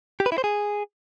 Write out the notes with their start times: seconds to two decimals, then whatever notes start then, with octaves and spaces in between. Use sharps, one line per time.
0.20 G4
0.26 B4
0.32 E4
0.38 C5
0.44 G#4